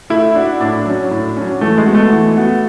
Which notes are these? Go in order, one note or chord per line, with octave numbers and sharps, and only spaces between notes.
A3 E4
D4 F#4
A2 D4
F#3 C#4
A2
F#3 C#4
E3 A3
G#3
B3 F#4
A3
E3
B3 F#4